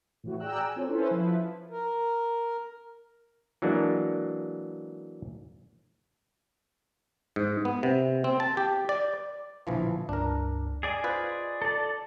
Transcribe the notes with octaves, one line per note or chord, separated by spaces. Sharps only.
A2 E3 F#4
G#4 D5 G5 A#5 E6 F#6
G#5
C4 F4 A4 C#5
C#4 E4 A4 B4 C5
F3 E4 B4
A#4
E3 F#3 G#3 A#3 D4
G#2
B3
C3
C4
A5
G4
D5
A#1 B2 D3 E3 F3
C#2 G2 D4 A#4
G#4 D5 D#5 G#5
F4 B4 C5
A4 D5